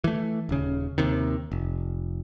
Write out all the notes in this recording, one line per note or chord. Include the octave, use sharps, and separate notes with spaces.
E3 A3
D#1 C#3
D#2 C3 D#3
F1